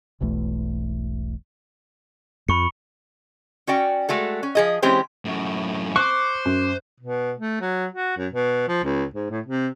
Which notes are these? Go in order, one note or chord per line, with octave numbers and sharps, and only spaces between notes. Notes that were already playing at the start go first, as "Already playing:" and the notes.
E1 B1 E2 A3
F2 B5 C#6 C#7
C#4 F#4 D5 G5
G#3 A3 F#4 A4
C#4
F3 G#4 D#5
E3 G#3 C4 C#4 G4 C5
F#2 A2
C5 C#6 D6 F#6
F#2
B2
A3
F#3
F#4
F#2
B2
F3
C#2
G#2
A2
C3